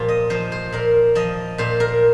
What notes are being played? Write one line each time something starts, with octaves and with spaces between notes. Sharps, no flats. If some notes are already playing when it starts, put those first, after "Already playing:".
Already playing: A#2 F3 F4 G4
D#5
F3 C5
C5
A#2 A#4
F3 D#5
A#2 C5
A#4